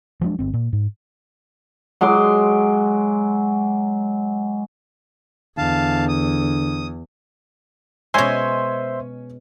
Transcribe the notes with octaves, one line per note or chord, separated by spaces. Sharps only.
F3 F#3 G#3 D4
G1 C4
A#2
G#2
F#3 G#3 C6 D6
E2 D3 F5 A5
D#6
B2 G#3 C#4 C5 C#5 E5 G#5 C6